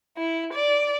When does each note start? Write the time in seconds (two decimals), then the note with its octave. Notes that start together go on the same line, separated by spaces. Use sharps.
0.17 E4
0.53 D5